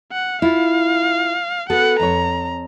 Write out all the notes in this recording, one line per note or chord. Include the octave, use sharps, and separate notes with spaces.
F#5
E4 F4 F5
B3 F#4 A4 B4 F#5
F2 C#5 A#5